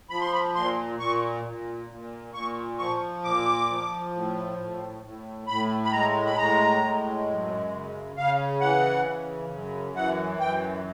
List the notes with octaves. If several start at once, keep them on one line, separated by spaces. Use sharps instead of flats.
F3 B5
C6
B5
A#2 C6
A#2 C#6
A#2
A#2
A#2 C#6
F3 C#6
A#2 D6
F3
A2
A2
A2
A2 B5
B5
G#3 A#5
B5
A2 A#5
G#3
F#2
C#3
C#3 F5
E3 F#5
C#3
F#2
E3 F#5
F#2 G5